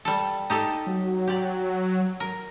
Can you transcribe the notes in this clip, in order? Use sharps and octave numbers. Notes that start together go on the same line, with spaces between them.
G3 A4
D#4 G4 A4
F#3
G4 D5
A#4